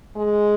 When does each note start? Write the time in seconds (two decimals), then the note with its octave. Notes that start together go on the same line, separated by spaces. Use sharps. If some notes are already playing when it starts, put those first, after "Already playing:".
0.17 G#3